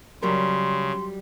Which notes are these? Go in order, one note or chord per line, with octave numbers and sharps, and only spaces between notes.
C#3 F#3 G3 A#4 C6